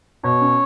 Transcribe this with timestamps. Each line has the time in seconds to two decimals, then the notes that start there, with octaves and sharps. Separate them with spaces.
0.23 B2 C#5
0.41 C#4